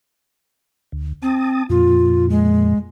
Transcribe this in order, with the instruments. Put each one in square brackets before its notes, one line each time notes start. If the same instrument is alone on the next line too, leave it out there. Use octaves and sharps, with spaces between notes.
[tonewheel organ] D2
[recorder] C4 [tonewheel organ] A5 D#6
[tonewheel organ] F2 A#2 [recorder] F4
[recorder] G#3